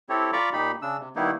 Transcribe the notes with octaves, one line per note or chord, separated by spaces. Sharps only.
C4 E4 G4 A4 C#5
F4 D5 A#5 B5 C#6 D6
A#2 D#4 G4 B5
C#3 D4 E6
C3
D#3 G3 A#3 B3 D#4 E4